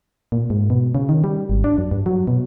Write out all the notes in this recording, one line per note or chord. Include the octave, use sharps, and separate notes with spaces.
A#2
G#2
B2
C#3
D#3
G3
G#1
D4
F#2
G2
F#3
B2